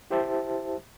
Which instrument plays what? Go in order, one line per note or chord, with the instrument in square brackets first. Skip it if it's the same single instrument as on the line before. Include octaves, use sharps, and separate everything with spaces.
[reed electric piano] E4 G4 C5 E5 A5